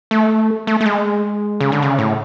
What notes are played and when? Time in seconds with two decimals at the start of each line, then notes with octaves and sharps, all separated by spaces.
0.11 A3
0.67 A3
0.81 A3
0.86 G#3
1.60 C#3
1.72 D3
1.82 C#3
1.98 A2